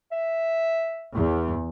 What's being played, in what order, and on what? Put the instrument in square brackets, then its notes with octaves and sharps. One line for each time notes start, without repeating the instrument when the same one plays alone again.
[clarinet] E5
[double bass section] E2